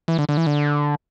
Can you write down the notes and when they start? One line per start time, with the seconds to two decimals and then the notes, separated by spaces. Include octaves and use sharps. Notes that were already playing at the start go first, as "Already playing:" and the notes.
0.08 E3
0.19 D3
0.29 D3
0.37 E3
0.47 D3